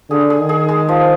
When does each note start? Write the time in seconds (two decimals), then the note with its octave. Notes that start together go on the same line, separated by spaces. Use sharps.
0.10 D3 G#4
0.30 G#4
0.39 D#3
0.49 G#4
0.69 G#3
0.89 F3